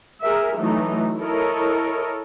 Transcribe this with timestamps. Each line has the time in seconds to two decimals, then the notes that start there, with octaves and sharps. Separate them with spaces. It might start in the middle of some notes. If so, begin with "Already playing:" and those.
0.22 G#4 A#4 E5
0.57 E3 F#3 A3 D#4
1.19 E4 A4 A#4 C#5 D#5